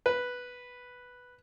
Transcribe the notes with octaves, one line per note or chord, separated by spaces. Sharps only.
B4